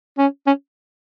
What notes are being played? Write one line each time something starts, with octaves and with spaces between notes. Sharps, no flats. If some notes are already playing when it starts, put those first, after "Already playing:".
C#4
C#4